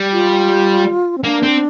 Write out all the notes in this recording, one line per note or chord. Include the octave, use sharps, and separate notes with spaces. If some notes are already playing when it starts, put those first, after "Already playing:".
Already playing: G3
F4
C4
A#3 D4
C4